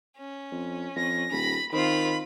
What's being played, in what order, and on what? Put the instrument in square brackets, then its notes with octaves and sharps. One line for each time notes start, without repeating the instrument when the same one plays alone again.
[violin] C#4
[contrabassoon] F2
[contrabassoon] F2 [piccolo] A#6
[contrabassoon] D#1 [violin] B5
[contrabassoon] D#3 [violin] C4 F4 [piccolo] B5